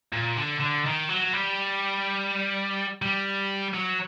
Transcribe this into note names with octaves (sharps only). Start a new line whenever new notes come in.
A#2
D3
D3
D#3
F#3
G3
G3
F#3